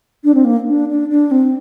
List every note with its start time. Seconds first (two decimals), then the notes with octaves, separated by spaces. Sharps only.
0.24 D4
0.34 C4
0.45 A#3
0.67 D4
0.89 D4
1.10 D4
1.31 C4